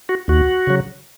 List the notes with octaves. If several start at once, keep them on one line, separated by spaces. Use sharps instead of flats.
F#4
D#2 F#4
C#3 F#3